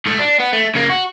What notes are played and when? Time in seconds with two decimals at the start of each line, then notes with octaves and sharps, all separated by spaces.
0.06 G#2 A3
0.19 D4
0.40 B3
0.53 A3
0.75 C#3 A#3
0.90 F#4